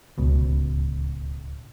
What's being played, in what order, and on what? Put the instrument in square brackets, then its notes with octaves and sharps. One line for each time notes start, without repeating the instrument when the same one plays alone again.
[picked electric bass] D1 C#2 B2